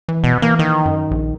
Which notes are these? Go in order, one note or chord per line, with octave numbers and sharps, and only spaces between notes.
E3
B2
E3 A#3
D#3
F#2
A#1